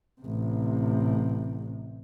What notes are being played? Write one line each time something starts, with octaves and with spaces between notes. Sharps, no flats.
A1 C3